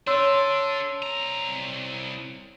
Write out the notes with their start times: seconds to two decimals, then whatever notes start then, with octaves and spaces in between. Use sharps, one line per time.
0.07 D4 A4 C#5 C6 E6
1.03 C2 A#5